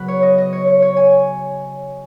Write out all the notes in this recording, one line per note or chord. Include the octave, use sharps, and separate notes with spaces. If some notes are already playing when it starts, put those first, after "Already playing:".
Already playing: C#3 F#3 B3 B4
C#5
D#5
D#5
C#5
C#5
C#5
G#5